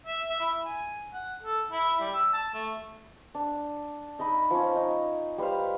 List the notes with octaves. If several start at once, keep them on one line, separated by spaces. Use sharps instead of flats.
E5
E5
E4
G#5
F#5
A4
E4
G3
E6
A5
A3
D4
D#4 D#5 E5 B5
F3 C#4
D#4
G3 B4 C5 F5